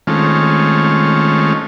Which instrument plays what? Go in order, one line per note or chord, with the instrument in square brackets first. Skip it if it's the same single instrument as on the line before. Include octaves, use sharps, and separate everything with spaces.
[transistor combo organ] D#3 G#3 A3 C4 C#4 F4